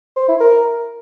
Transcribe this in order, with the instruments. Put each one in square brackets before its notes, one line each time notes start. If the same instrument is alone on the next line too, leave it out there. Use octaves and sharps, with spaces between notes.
[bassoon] C5
E4
A#4